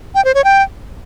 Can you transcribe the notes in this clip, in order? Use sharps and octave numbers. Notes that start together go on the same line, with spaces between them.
G5
C5
C#5
G5